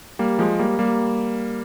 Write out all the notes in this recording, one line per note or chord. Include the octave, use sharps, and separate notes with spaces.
G3 A#3
F3 G#3
G3 A#3
G3 A#3